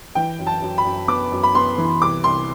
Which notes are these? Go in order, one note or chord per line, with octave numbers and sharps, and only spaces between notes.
E3 G5
F#2
A5
F#2
B5
F#2
B3 D6
F#2
B5
B3 C6
E3
C2 D6
C2 C6